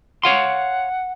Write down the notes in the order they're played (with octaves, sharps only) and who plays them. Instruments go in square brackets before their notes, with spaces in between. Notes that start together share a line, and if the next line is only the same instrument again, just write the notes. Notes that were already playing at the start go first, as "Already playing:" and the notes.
[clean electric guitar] C#5 F5 C6 [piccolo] F#5